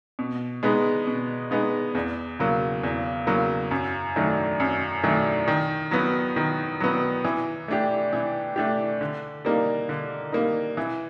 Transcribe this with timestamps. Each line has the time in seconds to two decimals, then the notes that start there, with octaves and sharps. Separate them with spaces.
0.19 B2
0.63 G#3 B3 D#4
1.07 B2
1.51 G#3 B3 D#4
1.95 E2
2.39 C#3 F#3 A#3
2.83 E2
3.27 C#3 F#3 A#3
3.71 F#2
4.16 D#3 F#3 A3 D4
4.60 F#2
5.03 D#3 F#3 A3 D4
5.48 D#3
5.91 F#3 B3
6.36 D#3
6.80 F#3 B3
7.25 E3
7.68 A3 D4 G4
8.13 E3
8.56 A3 D4 G4
9.01 D3
9.45 G3 A#3 D#4
9.89 D3
10.32 G3 A#3 D#4
10.77 E3